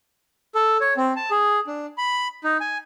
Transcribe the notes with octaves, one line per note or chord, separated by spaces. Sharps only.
A4
C#5
C4
A5
G#4
D4
B5
D#4
G#5